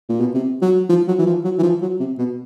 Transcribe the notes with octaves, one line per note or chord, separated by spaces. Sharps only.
A#2
B2
C3
F#3
F3
F#3
E3
F3
F#3
E3
F3
F#3
C3
B2